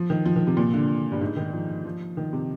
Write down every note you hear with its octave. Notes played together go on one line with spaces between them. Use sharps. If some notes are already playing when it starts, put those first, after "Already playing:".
Already playing: F3
D#3
F3
D#3
C3
A#2
D3
G2
G#2
D#3
F3
F3
D#3
C3